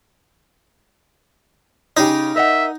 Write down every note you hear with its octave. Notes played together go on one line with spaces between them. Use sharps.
C#3 C#4 D#4 G4
A#4 D#5 E5 F#5